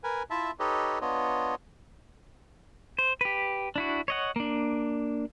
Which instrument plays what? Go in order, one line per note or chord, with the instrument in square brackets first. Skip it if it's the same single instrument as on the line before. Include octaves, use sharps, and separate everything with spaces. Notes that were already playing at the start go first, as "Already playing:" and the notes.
[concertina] A#4 B4 G#5
E4 F4 E5 A5
D#4 G4 A4 B4 C#5 D#5
B3 D4 F4 C#5 D#5
[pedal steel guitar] C5
G4 B4
D4 E4 F#4
C#5 D#5 F#5
A#3 D4